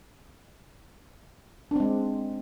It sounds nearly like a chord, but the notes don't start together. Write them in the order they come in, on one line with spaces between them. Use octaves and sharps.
D4 C4 G#3